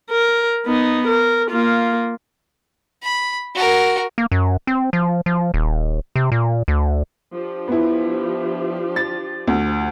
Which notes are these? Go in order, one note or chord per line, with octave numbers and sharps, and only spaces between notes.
A#4
B3 D#4
A#4
A#3 F4
B5
F#4 A#4
A#3
F#2
C4
F3
F3
D#1
C3
A#2
D2
F3 D4 G4
B3 E4
A6
D2